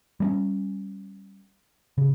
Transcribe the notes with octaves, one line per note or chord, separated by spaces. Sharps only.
G3 A#3 C#4
C#3